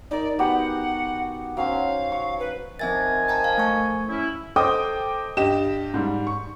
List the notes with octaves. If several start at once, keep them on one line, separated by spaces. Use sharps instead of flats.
D#4 A#4 D5
B3 F#4 G4 F#5
F#3 C#4 C5 F5
C#6
B4
D#3 F3 C4 E5 G#5 A6
G5 A5 A#5
F5
A3 C#6
C#4 E4
A4 C5 D#5 G5 D6 D#6
G2 G4 D#5 E7
G#2 G3
C#6